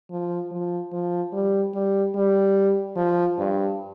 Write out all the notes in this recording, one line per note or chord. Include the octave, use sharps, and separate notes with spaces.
F3
F3
F3
G3
G3
G3
F3
G2